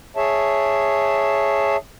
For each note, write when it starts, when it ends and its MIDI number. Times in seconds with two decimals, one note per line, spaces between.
0.17 1.77 68
0.17 1.77 73
0.17 1.77 76
0.17 1.77 81